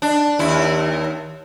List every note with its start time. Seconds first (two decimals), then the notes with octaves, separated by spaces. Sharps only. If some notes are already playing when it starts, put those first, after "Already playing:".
0.02 D4
0.39 D#2 E4